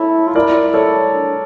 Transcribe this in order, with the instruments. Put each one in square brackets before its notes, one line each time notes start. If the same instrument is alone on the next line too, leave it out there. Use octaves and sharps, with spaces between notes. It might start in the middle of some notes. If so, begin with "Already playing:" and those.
Already playing: [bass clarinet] E4 [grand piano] A4 C#5
[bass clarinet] F4
[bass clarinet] E4 [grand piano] A#4 D5
[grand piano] A4 C#5
[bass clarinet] D4